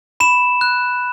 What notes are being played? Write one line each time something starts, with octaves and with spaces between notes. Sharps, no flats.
B5 E7
F#6